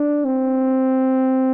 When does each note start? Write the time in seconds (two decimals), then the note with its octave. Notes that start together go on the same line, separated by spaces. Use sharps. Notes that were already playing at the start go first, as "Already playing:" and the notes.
Already playing: D4
0.25 C4